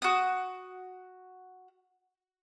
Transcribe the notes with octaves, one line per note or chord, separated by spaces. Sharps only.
F#4 D#6